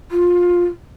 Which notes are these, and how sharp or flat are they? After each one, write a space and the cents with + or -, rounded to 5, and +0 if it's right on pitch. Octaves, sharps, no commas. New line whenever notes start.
F4 +15